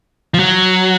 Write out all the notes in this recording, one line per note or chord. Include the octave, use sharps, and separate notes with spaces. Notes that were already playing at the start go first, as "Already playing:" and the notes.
F3
F#3